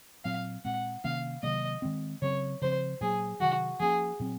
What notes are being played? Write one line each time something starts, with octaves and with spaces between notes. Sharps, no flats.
A#2 F#3 C4 F5
A#2 G#3 C4 F#5
C3 D#3 A#3 C#4 F5
C3 D#3 F#3 A#3 D#5
D#3 G#3 C4
C#3 F#3 C4 C#5
C#3 F3 C4 C5
A#2 F#3 A#3 G#4
C3 D#3 F#3 F#4
F3 A#3 C#4 G#4
A#2 F#3 C4